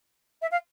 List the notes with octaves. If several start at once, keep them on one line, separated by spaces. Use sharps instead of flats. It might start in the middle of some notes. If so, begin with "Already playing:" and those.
E5
F5